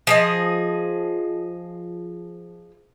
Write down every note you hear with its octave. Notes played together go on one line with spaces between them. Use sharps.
F3 G#4 D#5